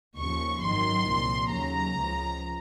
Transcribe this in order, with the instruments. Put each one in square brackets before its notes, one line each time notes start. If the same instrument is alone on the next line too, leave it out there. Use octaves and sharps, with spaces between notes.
[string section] D#2 C#3 F3 C#6
G#1 F#2 D#3 F#3 C6
C2 A#2 F3
D#2 C#3 F#3 A#5
C#2 C#3 F3